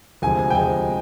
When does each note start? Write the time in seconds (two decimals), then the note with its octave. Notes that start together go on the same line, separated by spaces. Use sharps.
0.22 D2 C3 F3 G#3 G#5
0.39 G#5
0.50 G5
0.55 D2 C3 F3 G#3 G#5